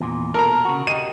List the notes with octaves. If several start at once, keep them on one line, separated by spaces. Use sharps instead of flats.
E2 A#2
B2 A4 A#4 A#5
C#3 F#4
G4 D#5 D#7